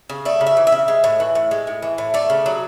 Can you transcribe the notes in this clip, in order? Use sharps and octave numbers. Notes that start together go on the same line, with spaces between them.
C#3
A3 D5
C#3
E5
E3
E5
C#3
G#3
A2
E3
A2
G#3
A2
E3
A2
A3 D5
C#3
F#3